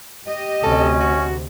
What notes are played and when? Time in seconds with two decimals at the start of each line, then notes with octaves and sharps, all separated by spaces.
0.25 G4 D#5
0.64 D2 C3 C#4 A4
1.00 F#4